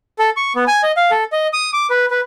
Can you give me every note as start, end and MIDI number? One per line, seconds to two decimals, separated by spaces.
0.19 0.30 69
0.37 0.53 85
0.55 0.64 59
0.67 0.82 80
0.83 0.92 75
0.97 1.11 77
1.11 1.24 69
1.32 1.47 75
1.53 1.71 87
1.73 1.87 86
1.90 2.06 71
2.11 2.21 71